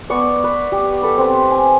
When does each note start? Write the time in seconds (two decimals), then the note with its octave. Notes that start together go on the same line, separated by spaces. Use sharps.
0.10 B3 D5 C#6 E6
0.44 B4
0.72 G4
1.02 G4 A4 B4 B5
1.18 C4 B4
1.50 G#5